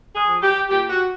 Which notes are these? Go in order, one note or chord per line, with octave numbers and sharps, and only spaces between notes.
G#4
F3
G4
A#2 G4
F#4